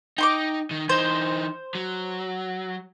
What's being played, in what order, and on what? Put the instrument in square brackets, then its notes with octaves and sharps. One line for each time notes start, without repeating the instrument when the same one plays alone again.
[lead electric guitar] D#4 [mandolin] G5 C6 D6
[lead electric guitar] D#3
[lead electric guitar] E3 D#4 [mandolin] C5
[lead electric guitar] F#3